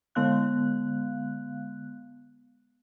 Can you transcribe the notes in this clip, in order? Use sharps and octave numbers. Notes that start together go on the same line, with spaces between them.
D3 G#3 B3 F5 F#6